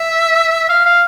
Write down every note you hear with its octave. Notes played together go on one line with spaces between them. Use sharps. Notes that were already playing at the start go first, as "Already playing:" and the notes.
Already playing: E5
F5
F5